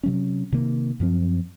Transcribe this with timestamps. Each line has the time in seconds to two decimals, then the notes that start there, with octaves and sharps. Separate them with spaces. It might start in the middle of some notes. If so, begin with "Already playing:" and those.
0.03 C3 F#3 C#4
0.52 C3 D#3 A#3
1.00 F#2 F3 C4